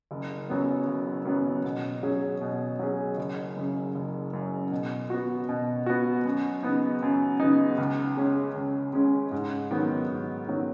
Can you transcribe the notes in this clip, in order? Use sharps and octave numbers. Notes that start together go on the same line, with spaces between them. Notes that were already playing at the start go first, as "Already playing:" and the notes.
F#1
F#2 F#3 B3
F#1
F#2 F#3 B3
B2
F#3 C#4 G#4
B2
F#3 C#4 G#4
F#1
F#2 C#3
F#1
F#2 C#3
B2
B3 F#4
B2
B3 F#4
F#2
C#3 B3 D#4
F#2
C#3 B3 D#4
C#2
C#3 G#3 C#4
C#2
C#3 G#3 C#4
G#2
D#3 F#3 B3
G#2
D#3 F#3 B3